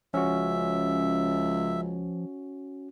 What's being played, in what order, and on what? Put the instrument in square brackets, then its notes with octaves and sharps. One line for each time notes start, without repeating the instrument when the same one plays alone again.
[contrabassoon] C#2 [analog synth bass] F3 [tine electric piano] C#4 F#4 [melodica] E5